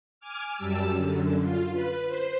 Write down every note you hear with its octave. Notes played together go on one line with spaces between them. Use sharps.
G#5 D6 F6
F#2 G3 A5 E6
F#2 D3
F4
B4
C5